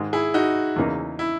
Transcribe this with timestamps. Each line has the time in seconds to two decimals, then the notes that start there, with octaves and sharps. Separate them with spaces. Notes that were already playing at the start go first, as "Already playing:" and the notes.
Already playing: G#2 D#3 G#3
0.13 E4 G#4
0.34 D#4 F#4
0.76 E2 C#3 E3 A#3 D#4
1.19 E4